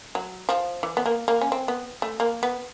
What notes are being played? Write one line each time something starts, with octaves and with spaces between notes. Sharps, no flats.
F#3
F3
E3
B3
A#3
A#3
C#4
C4
B3
A3
A#3
B3